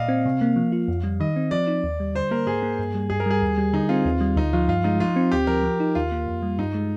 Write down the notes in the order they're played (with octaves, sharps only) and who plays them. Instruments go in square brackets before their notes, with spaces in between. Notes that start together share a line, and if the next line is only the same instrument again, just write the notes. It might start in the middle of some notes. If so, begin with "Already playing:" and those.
Already playing: [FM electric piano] A#2 [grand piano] D5 D#5 F5
[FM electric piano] C4
C3
A#3
F3
F4
F2
G3
[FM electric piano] D#3 [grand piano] D#5
[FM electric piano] C4
[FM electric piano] F3 [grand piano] D5
[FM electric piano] D#4
D#2
G3
[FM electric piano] D3 [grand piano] C5
[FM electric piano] A#3 [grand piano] A#4
[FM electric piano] G#2 [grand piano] G#4
[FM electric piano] A#3
G2
G3
[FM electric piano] G2 [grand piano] G#4
[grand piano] A#4
[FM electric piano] G3 [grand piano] G#4
[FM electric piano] D#2
G3
[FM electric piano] D3 [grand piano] D#4
[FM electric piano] C4 [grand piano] F4
[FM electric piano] D#2
G3
[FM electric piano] D2 [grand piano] D#4
[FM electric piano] F3 [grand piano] F4
[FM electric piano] G2 [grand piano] F4
[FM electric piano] G#3 [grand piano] D#4
[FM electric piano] F3 [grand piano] F4
[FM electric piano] C4
[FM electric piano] D2 [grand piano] G4
[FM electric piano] F3 [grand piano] A#4
[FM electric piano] F3
D#4
[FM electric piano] D#2 [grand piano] F4
[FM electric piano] A#3
F2
G3
[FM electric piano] G2 [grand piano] D#4
[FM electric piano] G#3